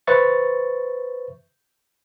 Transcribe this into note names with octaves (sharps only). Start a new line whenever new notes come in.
B4 C5 E5 C#6 A6